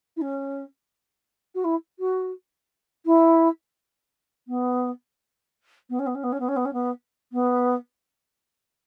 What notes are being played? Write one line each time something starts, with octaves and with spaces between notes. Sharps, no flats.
E4
C#4
F#4
E4
F#4
E4
B3
B3
C#4
B3
C#4
B3
C#4
B3
C#4
B3
C#4
B3
B3